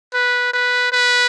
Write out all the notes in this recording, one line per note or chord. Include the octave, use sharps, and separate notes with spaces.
B4
B4
B4